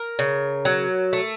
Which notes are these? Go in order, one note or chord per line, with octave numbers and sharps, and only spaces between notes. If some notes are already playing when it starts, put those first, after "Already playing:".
Already playing: A#4
C#3
F#3
A3